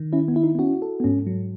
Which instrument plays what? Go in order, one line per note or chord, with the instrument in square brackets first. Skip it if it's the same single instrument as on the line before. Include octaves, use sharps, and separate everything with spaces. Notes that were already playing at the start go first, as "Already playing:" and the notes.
Already playing: [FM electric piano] D#3
[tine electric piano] C#4 [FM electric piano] E4
[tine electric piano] B3
[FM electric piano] E4
[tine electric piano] D#4
B3
[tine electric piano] C#4 [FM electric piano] F#4
[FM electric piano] A4
[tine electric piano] B3
[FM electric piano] G#2 [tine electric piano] C#4
[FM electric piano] F#3